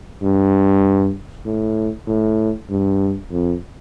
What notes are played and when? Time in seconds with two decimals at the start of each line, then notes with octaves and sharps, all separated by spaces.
0.22 G2
1.45 A2
2.07 A2
2.69 G2
3.31 F2